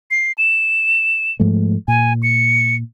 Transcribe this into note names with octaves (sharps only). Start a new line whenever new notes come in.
C7
E7
G#2 F3 A3
A#2 G#5
C#7